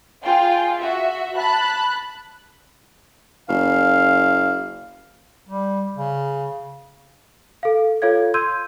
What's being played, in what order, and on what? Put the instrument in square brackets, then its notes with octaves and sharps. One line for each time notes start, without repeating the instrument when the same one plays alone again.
[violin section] F4 G#4 G5
F#4 E5
A5 B5 F#6
[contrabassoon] F#1 [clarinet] F5
[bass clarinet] G3
C#3
[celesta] A4 F5
F4 A4 C#5 F5 G#6
C6 E6 G6 G#6 D#7